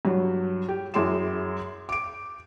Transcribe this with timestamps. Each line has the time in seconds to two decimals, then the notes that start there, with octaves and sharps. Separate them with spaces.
0.05 G2 F#3
0.69 G4
0.94 F#2 E4 G#4 C6 D6 E7
1.89 D6 D7